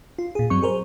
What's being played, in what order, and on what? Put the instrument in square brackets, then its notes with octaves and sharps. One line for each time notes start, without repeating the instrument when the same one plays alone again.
[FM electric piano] F4
A#2 G#4
G2 F#3 C4 C#6
G#4 A#4 C5